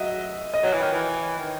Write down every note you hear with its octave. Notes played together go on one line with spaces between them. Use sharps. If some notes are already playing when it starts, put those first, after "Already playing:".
Already playing: F#3 D#5 E5
D#5
F#3 C#5
E3
D#3
E3
D#3